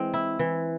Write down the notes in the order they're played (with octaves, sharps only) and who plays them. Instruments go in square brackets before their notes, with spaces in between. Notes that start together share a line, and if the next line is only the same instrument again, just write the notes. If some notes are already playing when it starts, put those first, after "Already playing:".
Already playing: [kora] E3 G#3 C4
E4
E3